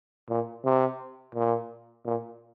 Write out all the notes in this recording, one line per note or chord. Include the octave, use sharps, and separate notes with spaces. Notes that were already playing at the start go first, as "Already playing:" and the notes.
A#2
C3
A#2
A#2